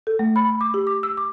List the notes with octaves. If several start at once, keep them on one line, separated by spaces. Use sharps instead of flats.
A4
A3
B5
B5
D6
G4
D6
E6
D6